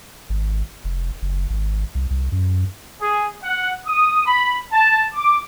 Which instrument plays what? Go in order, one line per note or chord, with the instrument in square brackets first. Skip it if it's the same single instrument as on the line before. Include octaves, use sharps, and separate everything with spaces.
[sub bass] G#1
F1
F#1
G#1
C2
C2
F#2
[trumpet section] G#4
F#5
D#6
B5
A5
D6